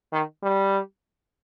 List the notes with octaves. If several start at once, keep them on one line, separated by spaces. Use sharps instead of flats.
D#3
G3